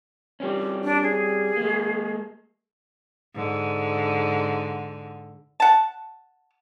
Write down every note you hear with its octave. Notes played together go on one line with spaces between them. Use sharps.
G3 C4 C#4
D4
G#4
G#3 A#3
G#2 D3
F#5 A5